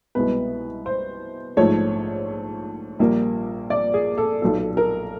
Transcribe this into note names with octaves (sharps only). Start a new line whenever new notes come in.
C2 B2 G#3 B3 B4
C5
A#1 G#2 F3 A3 C#5
A#1 A#2 G3 A#3
D5
G#4
A4
B1 A#2 F#3 B3 A4
A#4